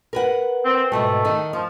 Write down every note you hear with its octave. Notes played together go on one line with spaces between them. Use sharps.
A#4 B4 F#5
C4
G#2 B2 G3 A3
D#3 D#4
F3 D#4